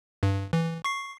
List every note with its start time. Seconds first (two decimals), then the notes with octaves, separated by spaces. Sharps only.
0.23 G2
0.53 E3
0.84 C#6 C7